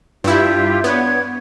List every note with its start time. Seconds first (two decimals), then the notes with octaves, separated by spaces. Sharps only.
0.24 G2 E4 F4 G4 E5
0.84 B3 D4 C#5 G#6